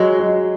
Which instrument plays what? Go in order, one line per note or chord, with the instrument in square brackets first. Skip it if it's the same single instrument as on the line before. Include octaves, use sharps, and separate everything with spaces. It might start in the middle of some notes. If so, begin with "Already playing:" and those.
Already playing: [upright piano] F#3 [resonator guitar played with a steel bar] G#3
[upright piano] F#3